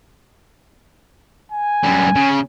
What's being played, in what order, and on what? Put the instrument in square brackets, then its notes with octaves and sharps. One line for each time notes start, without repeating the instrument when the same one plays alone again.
[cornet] G#5
[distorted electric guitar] F#2 G3
C#3